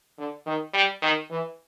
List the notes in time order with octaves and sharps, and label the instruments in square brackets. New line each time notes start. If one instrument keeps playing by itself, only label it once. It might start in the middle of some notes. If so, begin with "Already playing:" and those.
[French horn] D3
D#3
G3
D#3
E3